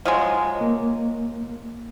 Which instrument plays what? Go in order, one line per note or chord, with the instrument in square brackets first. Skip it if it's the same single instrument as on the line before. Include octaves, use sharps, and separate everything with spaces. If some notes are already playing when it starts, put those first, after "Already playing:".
[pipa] F3 F#3 G#3 [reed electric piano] D#5
[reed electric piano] A#3